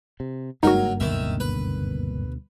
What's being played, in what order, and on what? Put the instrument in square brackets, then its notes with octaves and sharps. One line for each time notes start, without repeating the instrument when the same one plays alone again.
[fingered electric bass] C3
[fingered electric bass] F#1 G2 A#3 [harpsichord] F#3 A#4 [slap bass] G#3 [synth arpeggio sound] D#4 F#4
[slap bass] D2 B2 D3 [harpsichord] D#3 E5
[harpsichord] B4